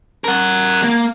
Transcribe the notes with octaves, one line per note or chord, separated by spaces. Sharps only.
A#4 F#5
A#3